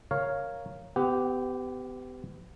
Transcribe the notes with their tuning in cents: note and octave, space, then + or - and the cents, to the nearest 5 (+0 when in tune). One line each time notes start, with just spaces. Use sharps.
A#4 +0 C#5 +0 F5 +0
B3 +35 G4 -10 F#5 +0